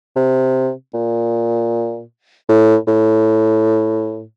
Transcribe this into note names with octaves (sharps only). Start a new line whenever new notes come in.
C3
A#2
A2
A2